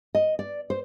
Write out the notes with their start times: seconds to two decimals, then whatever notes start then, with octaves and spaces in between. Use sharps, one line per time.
0.15 D#5
0.39 D5
0.70 C5